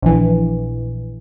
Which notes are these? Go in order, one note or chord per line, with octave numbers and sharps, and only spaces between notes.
A#1 E3